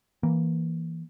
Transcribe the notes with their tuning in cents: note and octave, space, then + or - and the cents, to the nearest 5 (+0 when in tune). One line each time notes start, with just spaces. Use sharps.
E3 +0 A#3 +0